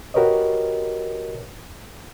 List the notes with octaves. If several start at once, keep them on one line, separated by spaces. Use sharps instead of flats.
F#4 G4 A#4 B4 C#5 D#5